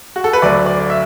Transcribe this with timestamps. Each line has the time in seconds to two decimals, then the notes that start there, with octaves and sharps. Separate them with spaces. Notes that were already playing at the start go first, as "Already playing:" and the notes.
0.16 F#4
0.24 A4
0.33 B4
0.42 D2 D3 F#3 D5
0.66 D5
0.79 D5
0.90 E5